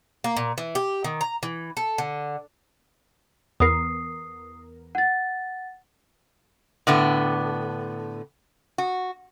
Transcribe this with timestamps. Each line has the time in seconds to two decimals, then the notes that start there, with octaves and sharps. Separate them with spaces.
0.24 A#3
0.37 A#2
0.58 E3
0.75 G4
1.04 D#3
1.21 A#5
1.43 E3
1.77 A4
1.98 D3
3.60 E2 B3 A#4 D#6 C7
4.95 F#5 A6
6.87 A2 D3 B3
8.78 F#4